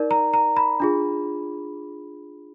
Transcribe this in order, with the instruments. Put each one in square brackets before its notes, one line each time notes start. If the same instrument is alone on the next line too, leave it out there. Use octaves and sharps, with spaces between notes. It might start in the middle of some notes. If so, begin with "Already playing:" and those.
Already playing: [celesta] D#4 A#4 D5
A#5
A#5
B5
D4 F4 G#4